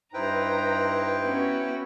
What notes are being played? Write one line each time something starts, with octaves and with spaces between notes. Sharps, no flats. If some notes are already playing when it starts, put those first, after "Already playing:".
G2 D#4 E4 B4 C5 G5 A#5
B3 C#4 F#4